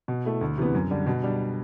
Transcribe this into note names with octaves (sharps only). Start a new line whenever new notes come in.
B2
A3 E4
D2
C3 E3 B3
F#2
D3 G3 D4
B2
G3 D4